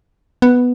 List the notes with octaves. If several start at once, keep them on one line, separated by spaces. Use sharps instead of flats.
B3